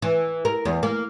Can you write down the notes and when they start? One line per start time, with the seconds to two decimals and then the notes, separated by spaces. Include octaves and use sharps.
0.02 E3
0.45 A#4
0.65 E2
0.83 A#3